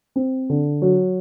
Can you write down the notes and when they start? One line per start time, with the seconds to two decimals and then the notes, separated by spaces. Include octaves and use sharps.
0.16 C4
0.50 D3
0.82 F#3